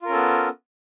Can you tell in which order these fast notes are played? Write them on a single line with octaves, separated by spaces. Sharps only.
F4 A#4 C#4 A4 B3